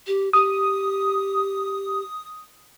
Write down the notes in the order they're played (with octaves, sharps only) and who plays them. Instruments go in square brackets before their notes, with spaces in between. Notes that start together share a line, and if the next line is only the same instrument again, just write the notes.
[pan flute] G4
[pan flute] G4 [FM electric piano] D#6